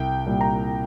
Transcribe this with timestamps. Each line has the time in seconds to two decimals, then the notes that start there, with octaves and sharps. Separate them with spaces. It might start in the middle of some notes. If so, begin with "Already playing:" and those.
Already playing: C2 G5
0.26 A#2 G3
0.41 A#5